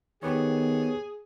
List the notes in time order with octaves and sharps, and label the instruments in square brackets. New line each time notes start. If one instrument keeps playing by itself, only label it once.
[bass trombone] D#3 [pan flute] B3 [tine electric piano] G4 B4 C#5 [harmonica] G#4